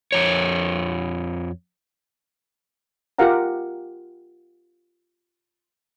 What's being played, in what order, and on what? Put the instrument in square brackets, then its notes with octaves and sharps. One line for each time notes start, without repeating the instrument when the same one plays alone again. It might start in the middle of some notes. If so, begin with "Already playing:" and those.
[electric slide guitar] F2 C#5
[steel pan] F4 G4 A#4 F5 F#5 A#5